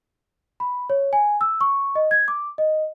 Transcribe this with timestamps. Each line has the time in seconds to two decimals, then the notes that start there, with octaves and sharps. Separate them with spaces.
0.60 B5
0.90 C#5
1.13 G#5
1.41 E6
1.61 C#6
1.95 D#5
2.11 G#6
2.28 D6
2.58 D#5